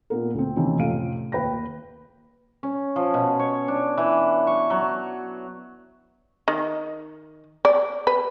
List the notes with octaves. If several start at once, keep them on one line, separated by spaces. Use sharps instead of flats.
A#2 B3 A#4
D2 C4
C3 D#3 E3 A#3 C#4 E4
F2 A2 C3 F5 D7 D#7
D#2 A#3 B4 G5 A#6
C#4
F3
B2
C#5
D4
E3
C#6
F#3
D#3
D5
B4